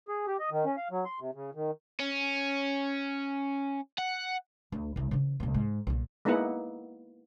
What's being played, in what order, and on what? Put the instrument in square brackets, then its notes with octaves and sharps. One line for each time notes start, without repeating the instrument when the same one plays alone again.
[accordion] G#4
G4
D#5
D#3
C#4
F5
F#3
C6
C3
C#3
D#3
[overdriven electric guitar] C#4
F#5
[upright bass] D2
C2 E4
C#3 E3
C2 A#2
G#2
B1 A#2
[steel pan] G#3 A#3 B3 D#4 E4 F#5